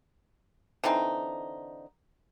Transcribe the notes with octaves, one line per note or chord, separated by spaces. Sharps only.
D3 E3 C4 D#4